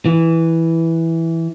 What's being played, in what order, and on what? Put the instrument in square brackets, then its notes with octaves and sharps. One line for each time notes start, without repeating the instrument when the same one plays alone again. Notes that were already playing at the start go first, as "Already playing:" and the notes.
[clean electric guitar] E3